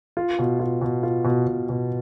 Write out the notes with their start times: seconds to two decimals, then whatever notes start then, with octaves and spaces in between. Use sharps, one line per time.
0.17 F4
0.39 B2
0.60 F4
0.82 B2
1.03 F4
1.25 B2
1.47 B2
1.69 B2